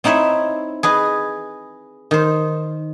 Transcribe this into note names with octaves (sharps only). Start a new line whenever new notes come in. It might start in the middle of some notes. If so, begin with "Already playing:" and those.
C4 D#4 E4 C#5 E5
G#4 B4 D#5
D#3 C5